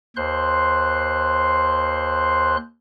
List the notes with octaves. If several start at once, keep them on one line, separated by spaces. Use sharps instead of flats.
D#2 C5 C6 F#6